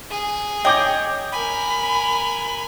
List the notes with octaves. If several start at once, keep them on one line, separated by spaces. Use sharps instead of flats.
G#4
C#5 D#5 G5 D6 G6
A#4 G#5 B5